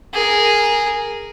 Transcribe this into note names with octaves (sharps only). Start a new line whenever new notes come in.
G#4 A#4